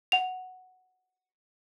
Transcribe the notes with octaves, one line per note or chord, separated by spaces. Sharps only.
F#5 F7